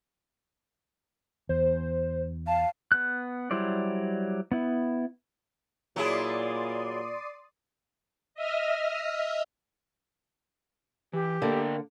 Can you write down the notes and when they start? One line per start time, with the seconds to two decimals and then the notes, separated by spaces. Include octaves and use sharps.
1.49 E2 C5
2.47 F5 A5
2.92 B3 F#6
3.51 F#3 G3 E4 C5 D5
4.52 B3 E4
5.96 A#2 F#3 E4 G#4 D5 C6 D#6
8.35 D#5 E5 D#6 F6
11.13 E3 G4
11.42 D3 A#3 A4 D5 G5